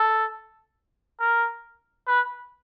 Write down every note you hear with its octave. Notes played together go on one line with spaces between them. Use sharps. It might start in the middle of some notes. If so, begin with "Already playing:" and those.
Already playing: A4
A#4
B4